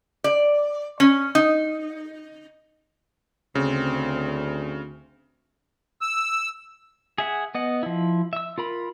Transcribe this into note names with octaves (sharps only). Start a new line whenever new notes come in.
D5
C#4
D#4
D2 C#3 C4
E6
G#4 E5 F#5
B3 D#5 F#5
F3 E4
E5 E6
F4 A#4 B5